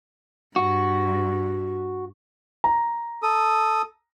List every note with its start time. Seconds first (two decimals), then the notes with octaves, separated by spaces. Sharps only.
0.56 G2 F#4
2.64 A#5
3.23 A4 D#6